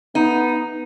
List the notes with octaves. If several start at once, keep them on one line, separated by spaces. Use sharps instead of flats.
B3 D#4